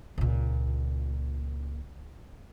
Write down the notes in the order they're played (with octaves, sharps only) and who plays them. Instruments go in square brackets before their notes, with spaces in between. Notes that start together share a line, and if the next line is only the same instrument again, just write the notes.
[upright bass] C#2 A#2